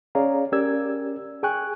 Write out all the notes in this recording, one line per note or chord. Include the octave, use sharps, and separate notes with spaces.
C#4 G#4 C#5 D5 F5 A#5
C#4 G4 A#4 D5 E6 G#6
G#4 G5 G#5 C#6 F#6